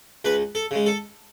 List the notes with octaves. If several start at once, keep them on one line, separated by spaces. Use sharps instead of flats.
C#2 B4
A4
C#3 G#3
A4